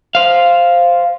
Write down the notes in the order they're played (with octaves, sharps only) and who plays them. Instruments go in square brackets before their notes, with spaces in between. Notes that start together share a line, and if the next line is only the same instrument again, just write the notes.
[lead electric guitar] C5 F5